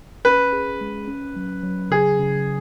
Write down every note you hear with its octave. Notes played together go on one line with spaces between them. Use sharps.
C#4 B4
G#4
G#3
C#4
F#3
F#3
C#3 G#4
C#3